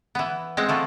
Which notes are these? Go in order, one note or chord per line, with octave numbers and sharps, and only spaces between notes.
E3 B3
G#3 C4 F#5
E3 A3 F4